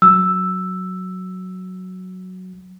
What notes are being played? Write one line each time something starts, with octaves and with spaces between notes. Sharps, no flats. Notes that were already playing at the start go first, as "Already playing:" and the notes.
F#3 E6